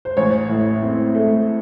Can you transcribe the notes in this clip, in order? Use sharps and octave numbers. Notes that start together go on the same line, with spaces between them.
C5
A1 C#5
A2
C4
A3